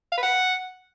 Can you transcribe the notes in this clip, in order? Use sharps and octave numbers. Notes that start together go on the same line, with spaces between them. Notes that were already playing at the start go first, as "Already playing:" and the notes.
F5
B4
F#5